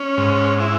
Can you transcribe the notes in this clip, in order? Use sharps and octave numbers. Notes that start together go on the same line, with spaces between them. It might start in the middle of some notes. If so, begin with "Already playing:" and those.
Already playing: C#4
G#2
E4